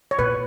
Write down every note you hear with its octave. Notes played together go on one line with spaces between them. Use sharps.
C#5
A#2 B4